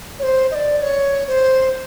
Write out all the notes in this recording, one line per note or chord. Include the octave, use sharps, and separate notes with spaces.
C#5
C5
D#5
D5
C#5
C5